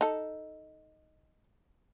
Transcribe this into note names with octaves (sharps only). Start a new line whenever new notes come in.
D#4 A4